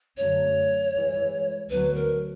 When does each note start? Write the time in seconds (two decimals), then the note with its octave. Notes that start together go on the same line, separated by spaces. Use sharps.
0.17 F#2 D3 F#3 A3 C#5
0.94 G2 E3 G#3
1.70 D2 D3 F#3 B3 B4
1.95 A#4